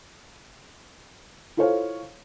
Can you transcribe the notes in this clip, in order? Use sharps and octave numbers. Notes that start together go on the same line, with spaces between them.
E4 F4 A4 C5 C#5 F5